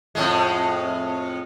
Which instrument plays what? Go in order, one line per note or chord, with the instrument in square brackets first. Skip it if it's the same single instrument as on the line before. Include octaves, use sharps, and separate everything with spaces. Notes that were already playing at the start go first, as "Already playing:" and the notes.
[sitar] F2 A2 G#3